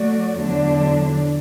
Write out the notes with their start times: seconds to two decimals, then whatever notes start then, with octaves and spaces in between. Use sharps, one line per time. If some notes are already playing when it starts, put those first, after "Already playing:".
Already playing: F#3 A3 F#4 D5
0.41 E2 D3 F#3 D4